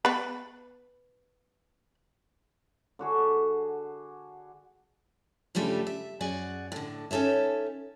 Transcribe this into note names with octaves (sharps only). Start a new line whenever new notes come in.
B3 B4
D3 F#4 G#4
G2 C#3 G3 A3 D4 F4
E5
F#2 F#4 G#4 D5 F#5 G#5
A2 D3
C#4 D#4 A4 C#5 E5